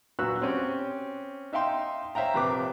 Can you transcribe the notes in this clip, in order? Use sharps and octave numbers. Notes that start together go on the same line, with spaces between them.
B1 A#2 F#4 B4 E6 F#6
C4 C#4 G4
D#4 E5 F5 G5 C6
C5 C#5 E5 F5 G5 A#5
A#1 C3 B4 D6